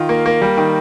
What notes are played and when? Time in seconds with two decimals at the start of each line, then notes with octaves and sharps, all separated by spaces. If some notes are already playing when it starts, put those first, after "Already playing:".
Already playing: D#3 F4
0.09 A#3
0.26 A#3
0.42 G3
0.57 D#3